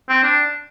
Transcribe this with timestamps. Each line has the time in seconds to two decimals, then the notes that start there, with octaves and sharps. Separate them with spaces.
0.09 C4
0.24 D4